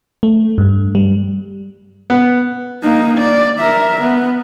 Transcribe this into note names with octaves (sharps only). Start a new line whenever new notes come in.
A3
G2
G3
B3
A#3 D#4
D5
A#4 E5
B3